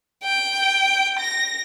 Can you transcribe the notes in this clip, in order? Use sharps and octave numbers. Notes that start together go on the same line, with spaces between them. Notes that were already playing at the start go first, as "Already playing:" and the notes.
G5
A#6